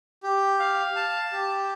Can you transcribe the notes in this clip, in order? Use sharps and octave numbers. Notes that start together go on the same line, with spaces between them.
G4
F5
A5
G4